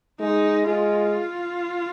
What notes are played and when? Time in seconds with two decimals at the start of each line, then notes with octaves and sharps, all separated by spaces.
0.20 G#3 D#4
0.67 G#3 F4